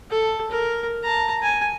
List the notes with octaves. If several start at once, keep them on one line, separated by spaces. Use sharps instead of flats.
A4
A#4
A5 A#5
G#5